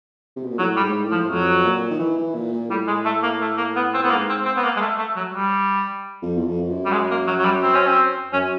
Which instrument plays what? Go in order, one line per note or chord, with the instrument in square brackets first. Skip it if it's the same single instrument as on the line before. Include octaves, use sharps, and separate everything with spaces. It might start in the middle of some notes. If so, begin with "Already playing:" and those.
[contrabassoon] C3
B2
A#2
[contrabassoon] A2 [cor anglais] F#3
[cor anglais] G3
[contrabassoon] G#2
A2
[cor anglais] F3
[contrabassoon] F2 [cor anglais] F#3
[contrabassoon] A#2
D#3
E3
E3
A#2
A#2
[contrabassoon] A2 [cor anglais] G3
[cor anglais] G#3
A3
A#3
A3
A#3
B3
C4
[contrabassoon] A2 [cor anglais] B3
[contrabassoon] G#2 [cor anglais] A#3
[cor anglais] C4
C4
B3
A#3
G#3
A3
A3
F#3
G3
[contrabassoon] F2
E2
F2
F2
F#2
[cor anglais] G3
G#3
A#3
F#3
F#3
G3
C4
C#4
C4
[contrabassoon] F#2 [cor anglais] C#4